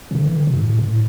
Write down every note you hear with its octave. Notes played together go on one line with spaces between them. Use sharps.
C3
D3
E3
D3
C3
G2
A2
A2